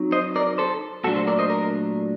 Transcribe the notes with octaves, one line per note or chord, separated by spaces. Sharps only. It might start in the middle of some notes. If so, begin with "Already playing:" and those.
Already playing: F#3 C4 D#4
C5 D#5
A#4 D5
A4 C5
A#2 F#3 A3 D4 F#4 A4
A4 C5
A#4 D5
C5 D#5
A#4